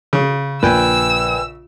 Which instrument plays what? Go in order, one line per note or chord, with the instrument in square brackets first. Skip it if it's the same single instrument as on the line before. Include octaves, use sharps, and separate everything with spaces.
[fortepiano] C#3
[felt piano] A#1 [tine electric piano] B4 G5 G#5 [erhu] E6